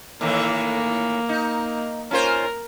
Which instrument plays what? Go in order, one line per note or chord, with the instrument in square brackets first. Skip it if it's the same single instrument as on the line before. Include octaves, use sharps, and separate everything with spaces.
[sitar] A2 D#3 E3 [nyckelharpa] A#3
[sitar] D#4
[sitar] C#4 F4 C5 [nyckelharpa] A#4